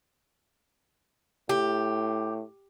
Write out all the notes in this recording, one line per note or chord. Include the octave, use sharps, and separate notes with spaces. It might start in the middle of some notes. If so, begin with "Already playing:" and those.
A2 G4